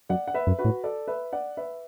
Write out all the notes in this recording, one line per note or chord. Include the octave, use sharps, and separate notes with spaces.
F#2 D5 F#5
F#5
B4 E5
F#2
F#4 B4
A2
A4 D5
B4 E5
D5 F#5
B4 E5